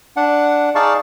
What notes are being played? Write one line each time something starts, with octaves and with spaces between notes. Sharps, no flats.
D4 F#5
D#4 G#4 D5 F5 A5 C#6